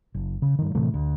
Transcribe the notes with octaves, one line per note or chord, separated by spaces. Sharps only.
F#1
C#3
G2 D#3
A2 C3 E3 A3
D2